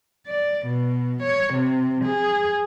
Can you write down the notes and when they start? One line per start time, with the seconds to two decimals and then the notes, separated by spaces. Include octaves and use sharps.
0.27 D5
0.66 B2
1.23 C#5
1.54 C3
2.05 G#4